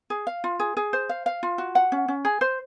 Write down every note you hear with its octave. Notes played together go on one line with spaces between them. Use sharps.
G#4
F5
F4
G#4
G#4
C5
F5
F5
F4
F#4
F#5
C#4
C#4
G#4
C5